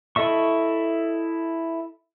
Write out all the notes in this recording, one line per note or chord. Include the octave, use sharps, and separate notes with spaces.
E4 A4 D#5 E5 C#6